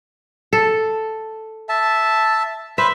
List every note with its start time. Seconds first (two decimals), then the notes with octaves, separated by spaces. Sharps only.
0.53 A4
1.69 E5 A5
2.78 B4 C5 E5